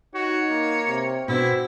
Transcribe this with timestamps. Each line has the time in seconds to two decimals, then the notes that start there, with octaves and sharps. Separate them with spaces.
0.15 D#4 F#4 C#5
0.50 A#3
0.88 C3
1.28 B2 C4 D4 E4 F#4 C5